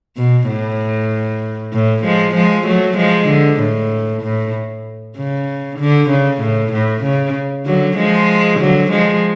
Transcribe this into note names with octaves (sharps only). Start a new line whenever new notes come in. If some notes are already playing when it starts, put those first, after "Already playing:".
B2
A2
A2
F3 G#3
F3 G#3
F#3 A3
F3 G#3
D3
A2
A2
C#3
D3
C#3
A2
A2
C#3
D3 F#3
F3 G#3
D3 F#3
F3 G#3